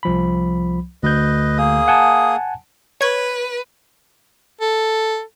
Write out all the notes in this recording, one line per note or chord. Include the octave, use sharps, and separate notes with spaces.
C2 F3 B5
D2 B4 D#5 G6
A#3 G#4 D#6
F#5 G#5 A5
B4 C#5 G#6
A4